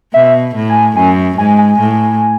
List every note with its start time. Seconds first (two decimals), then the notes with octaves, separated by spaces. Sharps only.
0.14 B2 E5
0.55 A2
0.69 G#5
0.96 F#2 G#5
1.38 G#2 G#5
1.58 G#5
1.79 A2